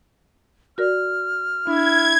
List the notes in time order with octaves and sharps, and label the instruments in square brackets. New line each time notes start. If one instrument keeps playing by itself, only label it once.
[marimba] F#4 A#4 D5 [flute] F6
[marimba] D4 [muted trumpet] E4 [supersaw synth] G#6